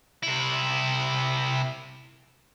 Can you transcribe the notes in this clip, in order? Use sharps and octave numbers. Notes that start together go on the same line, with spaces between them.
C3 E4